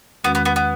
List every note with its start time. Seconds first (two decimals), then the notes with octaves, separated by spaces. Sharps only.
0.24 E2 D#3 G#3 B3 C#4 F#4
0.35 B3
0.45 B3
0.56 B3